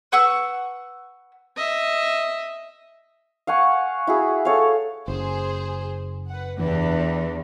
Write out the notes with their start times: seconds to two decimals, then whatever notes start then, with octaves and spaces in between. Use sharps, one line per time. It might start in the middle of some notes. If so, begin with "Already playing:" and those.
0.12 B4 F#5 C#6 E6
1.56 D#5 E5
3.47 F5 F#5 G#5 C#6
4.07 E4 F#4 G#4
4.45 A4 C#5 F5
5.08 F#1 G#4 C5
6.29 B4 F#5
6.60 E2 E3 D4 G4 B4